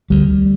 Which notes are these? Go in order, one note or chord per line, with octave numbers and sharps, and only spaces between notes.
D2 G3